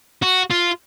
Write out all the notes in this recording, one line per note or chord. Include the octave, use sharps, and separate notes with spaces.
F#4
F4